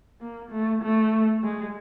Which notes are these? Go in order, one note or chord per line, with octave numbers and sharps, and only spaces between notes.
A#3
A3
A3
G#3